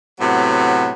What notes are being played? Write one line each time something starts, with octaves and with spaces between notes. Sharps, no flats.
A2 C3 F#3 B3